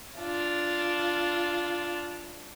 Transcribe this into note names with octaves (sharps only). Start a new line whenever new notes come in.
D4 F4